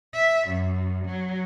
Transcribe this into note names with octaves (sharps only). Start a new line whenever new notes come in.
E5
F#2
F#3